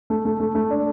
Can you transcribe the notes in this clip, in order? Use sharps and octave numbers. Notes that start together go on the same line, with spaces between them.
A3
A3
A3
A3
D4